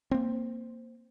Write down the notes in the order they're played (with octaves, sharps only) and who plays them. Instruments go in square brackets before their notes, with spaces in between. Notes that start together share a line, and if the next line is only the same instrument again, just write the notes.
[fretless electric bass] A#3 C4